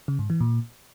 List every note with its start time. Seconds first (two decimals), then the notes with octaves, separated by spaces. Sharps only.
0.08 C#3
0.19 G#2
0.30 E3
0.41 A#2